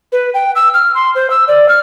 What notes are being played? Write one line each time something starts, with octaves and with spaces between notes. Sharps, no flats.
B4
G5
E6
F6
C6
C5
E6
D5
F6